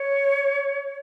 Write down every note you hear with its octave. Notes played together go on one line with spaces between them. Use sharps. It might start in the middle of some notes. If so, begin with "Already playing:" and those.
Already playing: C#5